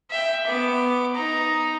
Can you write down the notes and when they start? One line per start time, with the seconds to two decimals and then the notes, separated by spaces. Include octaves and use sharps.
0.10 E5 G5
0.47 B3 D6
1.16 D#4 A#5